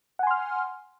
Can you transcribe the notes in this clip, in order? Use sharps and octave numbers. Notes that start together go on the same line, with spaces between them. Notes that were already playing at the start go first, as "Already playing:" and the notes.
F#5 G#5 C6 F6